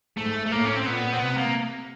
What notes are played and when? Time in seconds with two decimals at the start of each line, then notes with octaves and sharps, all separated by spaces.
0.17 G#2 A3
0.46 A3
0.51 A2 A#3
0.65 C#4
0.76 C4
0.86 A#2 B3
1.13 C4
1.20 C3 B3
1.38 A#3